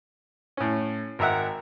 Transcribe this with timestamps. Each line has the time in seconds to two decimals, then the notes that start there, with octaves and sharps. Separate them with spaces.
0.57 A2 C#4
1.19 G#1 A#4 E5 F#5